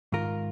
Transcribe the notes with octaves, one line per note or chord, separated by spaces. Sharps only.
G#2 D#3 F4 A#4